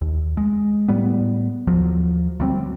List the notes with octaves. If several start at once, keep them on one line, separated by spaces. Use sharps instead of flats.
D#2
G#3
A2 G3 B3
D#2 F3 F#3
D2 F#3 G3 C4